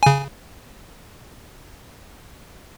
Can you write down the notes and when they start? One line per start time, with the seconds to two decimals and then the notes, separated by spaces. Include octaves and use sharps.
0.03 C#3 G#5